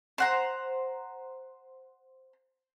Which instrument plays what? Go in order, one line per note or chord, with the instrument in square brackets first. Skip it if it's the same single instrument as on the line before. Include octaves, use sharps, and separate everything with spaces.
[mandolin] C5 F#5 A#5